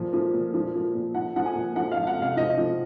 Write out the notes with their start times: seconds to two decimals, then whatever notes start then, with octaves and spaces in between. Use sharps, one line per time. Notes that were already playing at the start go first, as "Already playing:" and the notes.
Already playing: A#2 F3
0.13 F3
0.33 A#2
0.54 F3
0.75 F3
0.94 A#2
1.15 F3 F#5
1.36 F3 F#5
1.46 G#5
1.55 A#2
1.76 F3 F#5
1.92 F5
1.96 F3
2.07 F#5
2.17 C3
2.22 F5
2.36 F3 D#5
2.57 F3